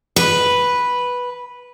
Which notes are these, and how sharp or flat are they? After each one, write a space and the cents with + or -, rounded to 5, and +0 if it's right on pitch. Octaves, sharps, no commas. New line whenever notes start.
B4 -5